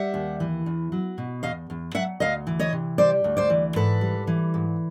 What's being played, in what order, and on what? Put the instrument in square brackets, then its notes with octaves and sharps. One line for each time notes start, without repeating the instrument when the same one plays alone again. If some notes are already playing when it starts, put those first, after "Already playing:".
Already playing: [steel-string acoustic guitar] G3 E5 F#5
D#2
E3
E2
F#3
B2
E2 D#5 F5
E2
F#3 E5 F#5
D2 D#5 F5
E3
C#5 D#5
C3
G3 C5 D5
D2
C5 D5
E3
G#2 A4 B4
G3
E3
G#2